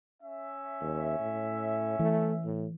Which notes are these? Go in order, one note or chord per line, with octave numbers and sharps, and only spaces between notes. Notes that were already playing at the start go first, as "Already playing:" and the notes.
C#4 E5
D#2
A2
E3 A3
A2